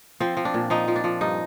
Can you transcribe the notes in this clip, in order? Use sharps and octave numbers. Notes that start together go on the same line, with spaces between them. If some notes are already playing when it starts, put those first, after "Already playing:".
F3 C4
F3
D4
A#2
F3 D#4
F3
D4
F3
G2 D#4